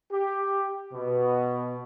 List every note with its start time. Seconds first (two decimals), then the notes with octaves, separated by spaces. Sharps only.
0.11 G4
0.93 B2